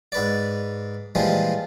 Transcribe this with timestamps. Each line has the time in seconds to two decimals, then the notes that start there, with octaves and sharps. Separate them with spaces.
0.12 G#2 B4 D5
1.15 A#2 E3 F3 G3 G#3